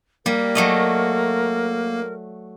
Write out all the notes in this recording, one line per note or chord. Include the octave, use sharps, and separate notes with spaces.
G3 A#3 A#4
F#3 A3 D#5